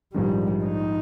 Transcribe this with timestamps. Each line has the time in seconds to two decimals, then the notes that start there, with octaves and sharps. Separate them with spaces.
0.14 A#1 G#2 D#3 G3
0.64 D#4